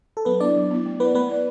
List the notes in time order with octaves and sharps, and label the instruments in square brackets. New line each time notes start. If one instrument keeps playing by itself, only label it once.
[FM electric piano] A4
[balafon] F#3 [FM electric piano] B3 B4
[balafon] B3 E4 [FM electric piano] D4 D5
[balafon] F#3
B3 E4
A3
[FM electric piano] B3 B4 [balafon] E4 D5
[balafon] A3 [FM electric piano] B3 B4
[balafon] E4 D5